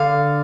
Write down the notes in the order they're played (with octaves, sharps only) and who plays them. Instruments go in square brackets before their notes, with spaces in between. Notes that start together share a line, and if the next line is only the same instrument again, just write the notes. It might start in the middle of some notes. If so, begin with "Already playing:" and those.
Already playing: [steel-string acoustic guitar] D3 F5